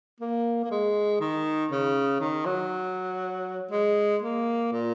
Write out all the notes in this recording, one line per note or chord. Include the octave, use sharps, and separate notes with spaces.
A#3
A#3
G#3
D#3
C#3
D#3
F#3
G#3
A#3
A#2